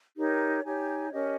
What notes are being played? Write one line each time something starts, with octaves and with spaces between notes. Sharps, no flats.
D#4 G4 A#4 C#5
D#4 G4 C#5 G#5
C#4 G4 A#4 D#5